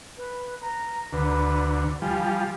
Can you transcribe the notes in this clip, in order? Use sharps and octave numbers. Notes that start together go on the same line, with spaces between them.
B4
A#5
D2 B4
F3 G3 G#5